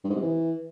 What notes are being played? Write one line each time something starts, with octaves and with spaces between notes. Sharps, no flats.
G2
G#2
C3
E3